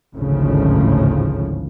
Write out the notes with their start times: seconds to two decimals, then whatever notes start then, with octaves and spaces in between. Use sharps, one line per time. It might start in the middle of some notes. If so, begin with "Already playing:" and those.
0.13 G#1 D2 A2 C#3 F3